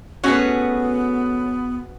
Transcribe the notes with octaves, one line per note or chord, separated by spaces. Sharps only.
A3 B3 C#4 F#4 G#4 B4 C#5